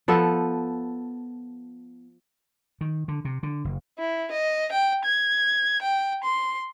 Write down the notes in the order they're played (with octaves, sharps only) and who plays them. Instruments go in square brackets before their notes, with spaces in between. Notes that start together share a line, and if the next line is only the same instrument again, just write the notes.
[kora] F3 B3 A4
[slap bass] D#3
D3
C3
D3
F#1
[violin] E4
D#5
G5
G#6
G5
C6